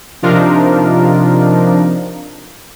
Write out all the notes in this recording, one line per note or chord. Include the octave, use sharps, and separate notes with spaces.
C3 F3 D4 D#4 F4 A#4